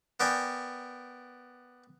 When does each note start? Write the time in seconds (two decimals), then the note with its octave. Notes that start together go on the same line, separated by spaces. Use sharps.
0.20 B3 A#4 D5 G5 G#5